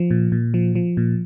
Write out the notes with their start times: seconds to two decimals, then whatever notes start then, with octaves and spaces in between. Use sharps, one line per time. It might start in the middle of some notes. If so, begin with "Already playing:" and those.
Already playing: F3
0.11 A#2
0.32 A#2
0.54 F3
0.75 F3
0.97 A#2